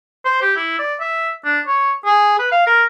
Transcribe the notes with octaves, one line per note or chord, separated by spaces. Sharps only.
C5
G4
E4
D5
E5
D4
C#5
G#4
B4
F5
A#4